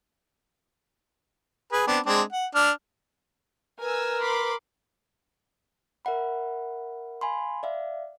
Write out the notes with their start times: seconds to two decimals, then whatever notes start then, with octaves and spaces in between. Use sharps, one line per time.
1.72 G#4 B4 G#5
1.87 B3 C4 D4
2.06 G#3 C4 D4
2.33 F#5
2.55 D4 F6
3.80 A#4 B4 G#5 E6
4.20 B5 C6 D6
6.05 A#4 E5 F#5 B5
7.21 F5 G#5 B5 C6
7.63 D5 E5 F5